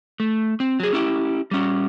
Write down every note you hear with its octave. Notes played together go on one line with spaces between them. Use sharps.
A3
C4
F#3 G#4
C#4 E4 G4
G3 C#4